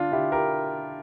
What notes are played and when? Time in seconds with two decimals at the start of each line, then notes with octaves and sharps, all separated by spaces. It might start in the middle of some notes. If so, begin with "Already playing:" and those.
Already playing: D3 D4 F4
0.12 D3 E4 G4
0.32 G4 A#4